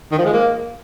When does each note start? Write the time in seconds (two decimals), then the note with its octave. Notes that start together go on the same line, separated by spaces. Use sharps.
0.12 D#3
0.18 F3
0.25 G#3
0.33 A#3